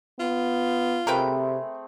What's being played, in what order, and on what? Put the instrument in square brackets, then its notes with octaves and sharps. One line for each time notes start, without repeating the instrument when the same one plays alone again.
[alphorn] B3 [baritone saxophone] F4
[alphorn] C3 [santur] A3 C4 G#4 [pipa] A#4 B4 G5